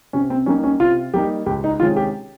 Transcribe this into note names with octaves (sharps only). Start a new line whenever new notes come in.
C3 C#4
C4
G3 A#3 C#4 D#4
C#4
C3 F4
G3 A#3 D#4 G4
C#2 G4
D#4
C3 D#3 G#3 C#4 F4
G4